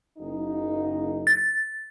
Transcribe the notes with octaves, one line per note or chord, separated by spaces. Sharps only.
F#1 D#4
A6